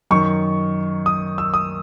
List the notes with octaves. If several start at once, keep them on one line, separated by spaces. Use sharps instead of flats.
F#2 D#3 C#6
D#6
E6
D#6